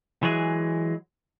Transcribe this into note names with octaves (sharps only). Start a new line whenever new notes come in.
E3 F#3 G#3 G#4